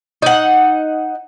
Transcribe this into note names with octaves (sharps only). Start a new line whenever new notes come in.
D#4 F#5